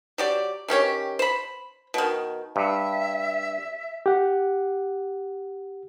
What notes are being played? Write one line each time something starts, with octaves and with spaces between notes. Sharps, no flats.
F#3 G4 D5
D#3 C#4 G4 C#5
C5 B5
B2 D#3
G2 E5
G4 F#5